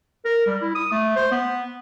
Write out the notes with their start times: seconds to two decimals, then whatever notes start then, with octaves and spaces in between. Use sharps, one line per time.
0.25 A#4
0.47 G3
0.62 E4
0.75 D#6
0.92 A3
1.16 C5
1.32 B3